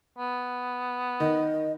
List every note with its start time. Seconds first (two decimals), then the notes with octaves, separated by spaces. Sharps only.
0.18 B3
1.20 D#3 D#5